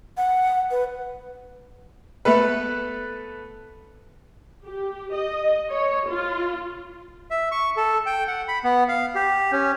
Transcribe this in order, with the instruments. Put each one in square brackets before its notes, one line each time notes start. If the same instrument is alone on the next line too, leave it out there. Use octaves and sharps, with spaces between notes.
[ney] F#5
B4
[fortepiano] A3 B3 A4 B4
[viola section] G4
D#5
C#5
F4
[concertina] E5
C#6
A4
G5
F#5
B5
B3
F5
G4
C#4